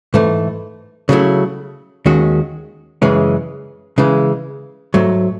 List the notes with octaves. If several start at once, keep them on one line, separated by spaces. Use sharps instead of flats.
G#2 E3 A3
C#3 F#3 A3 E4
D#2 D#3 G#3 C#4 F#4
F#2 C#3 E3 G#3 C#4
C#3 E3 G#3
G#2 F#3 A3